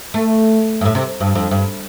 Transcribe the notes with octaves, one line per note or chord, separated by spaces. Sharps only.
A3
G2
A2
C3
G2
F2
G2